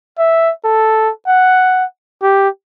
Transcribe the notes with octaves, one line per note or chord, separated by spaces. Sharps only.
E5
A4
F#5
G4